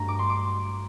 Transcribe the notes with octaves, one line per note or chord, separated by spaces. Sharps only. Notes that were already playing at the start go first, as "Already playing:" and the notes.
Already playing: G2 F#3 A3 A#5
D6
C6
D6